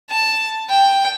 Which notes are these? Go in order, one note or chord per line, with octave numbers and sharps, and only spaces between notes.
A5
G5